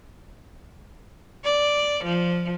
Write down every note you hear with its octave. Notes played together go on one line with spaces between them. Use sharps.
D5
F3